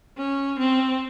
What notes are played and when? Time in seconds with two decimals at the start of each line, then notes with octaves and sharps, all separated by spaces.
0.18 C#4
0.60 C4